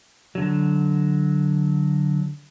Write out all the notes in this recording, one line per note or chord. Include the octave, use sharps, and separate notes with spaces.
D3 F#3